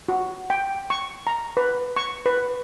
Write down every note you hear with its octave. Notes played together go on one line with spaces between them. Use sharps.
F#4
G5
C#6
A#5
B4
C#6
B4